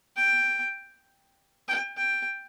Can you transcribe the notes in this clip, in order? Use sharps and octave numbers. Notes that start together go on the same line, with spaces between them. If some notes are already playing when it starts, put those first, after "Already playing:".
G5
G5
G5